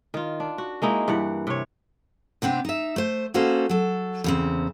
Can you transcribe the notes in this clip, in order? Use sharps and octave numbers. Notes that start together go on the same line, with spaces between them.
D#3 F4
D4
F#4
G#3 A#3 D#4 E4
G2 E3 F#5
C3 C#5
C3 B3 C4 D4
D#4 E5
A3 C5
A#3 C#4 F#4 A4 C5
F#3 A4
E2 C#3 C4